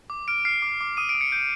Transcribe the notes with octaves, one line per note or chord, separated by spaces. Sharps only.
D6
F6 D7
F6 C7
D6
D6
D#6 D#7
D7
D#6
C#7
G6 D7